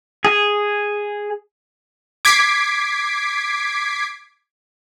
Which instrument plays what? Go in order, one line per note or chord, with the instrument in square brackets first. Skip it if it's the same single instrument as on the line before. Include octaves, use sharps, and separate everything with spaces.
[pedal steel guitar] G#4
[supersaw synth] D6 G#6 B6 C7 D7